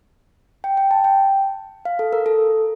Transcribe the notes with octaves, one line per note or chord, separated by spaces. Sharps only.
G5
G5
A5
G5
F5
A4
A#4
A4